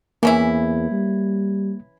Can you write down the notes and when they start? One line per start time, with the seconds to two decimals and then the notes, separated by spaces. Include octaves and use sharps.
0.23 E2 E3 A#3 C#4 E4
0.91 G3